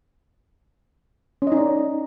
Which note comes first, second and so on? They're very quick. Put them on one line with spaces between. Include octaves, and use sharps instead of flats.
C#4 D#5 D#4 D5